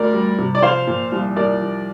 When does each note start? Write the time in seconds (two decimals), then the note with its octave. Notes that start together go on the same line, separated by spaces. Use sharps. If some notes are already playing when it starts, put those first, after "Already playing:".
Already playing: D2 A#4 D5
0.13 G3
0.38 C3
0.55 D5
0.62 F3 C5 F5
0.87 A#2
1.12 C2
1.36 C2 A#4 D5
1.61 F3